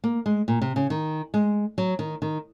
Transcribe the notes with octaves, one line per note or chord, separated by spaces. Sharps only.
A#3
G#3
A#2
C3
C#3
D#3
G#3
F#3
D#3
D#3